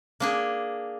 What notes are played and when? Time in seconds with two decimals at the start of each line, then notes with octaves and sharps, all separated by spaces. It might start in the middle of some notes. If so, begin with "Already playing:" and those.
0.20 A#3 D4 G#4